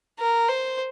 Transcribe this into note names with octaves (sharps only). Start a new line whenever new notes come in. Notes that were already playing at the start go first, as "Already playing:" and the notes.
A#4
C5